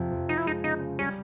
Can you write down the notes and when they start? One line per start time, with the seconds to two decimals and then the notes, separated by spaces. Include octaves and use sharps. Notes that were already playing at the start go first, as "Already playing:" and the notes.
Already playing: F2 C3 F3
0.11 F2
0.28 F3 D#4
0.38 E4
0.46 G#3 D#4
0.64 C#3 D#4
0.80 C#3
0.98 G3 C#4